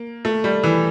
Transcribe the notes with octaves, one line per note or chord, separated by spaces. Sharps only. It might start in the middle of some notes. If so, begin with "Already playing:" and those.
Already playing: A#3
A3
G3
E3